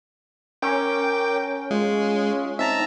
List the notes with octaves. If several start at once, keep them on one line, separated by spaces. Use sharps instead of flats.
C#4 A#4 G5 D6
G#3 F4
C4 D#4 E5 A5 A#5